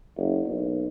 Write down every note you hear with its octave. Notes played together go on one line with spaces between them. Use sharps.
F#1
B1